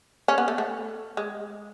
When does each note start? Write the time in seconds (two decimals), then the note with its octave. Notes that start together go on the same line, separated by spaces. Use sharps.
0.28 C#4
0.38 B3
0.48 A3
0.58 A3
1.17 G#3